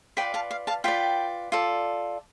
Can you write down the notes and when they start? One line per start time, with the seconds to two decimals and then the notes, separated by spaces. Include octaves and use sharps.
0.17 F4 B4 D5 G5 B5
0.34 F5 A5
0.51 F5
0.67 F5 A5
0.84 F4 B4 D5 G5 B5
1.52 F4 A4 D5